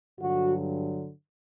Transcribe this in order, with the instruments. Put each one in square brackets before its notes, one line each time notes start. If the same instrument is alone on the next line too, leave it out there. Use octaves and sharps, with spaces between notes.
[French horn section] G2 D3 F#3 F#4